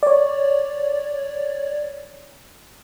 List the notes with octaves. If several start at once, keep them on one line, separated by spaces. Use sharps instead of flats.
C#5 D5